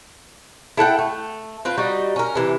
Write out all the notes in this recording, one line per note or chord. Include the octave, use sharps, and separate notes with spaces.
E4 A4 F#5 G5
A3
C4 F4 B4
G3 D#4 F#4
C#4 A#4
C3 E3